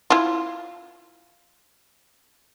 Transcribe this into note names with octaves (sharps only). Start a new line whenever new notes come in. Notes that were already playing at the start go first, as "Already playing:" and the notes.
E4 F4